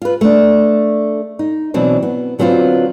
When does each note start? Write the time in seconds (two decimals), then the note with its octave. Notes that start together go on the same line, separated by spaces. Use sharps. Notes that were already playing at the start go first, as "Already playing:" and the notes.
0.02 F4 B4
0.21 A3 D4
1.39 D#4
1.74 B2 E3 F#3 C4 D4
2.03 B3
2.39 D3 F#3 B3 C4 F4 B4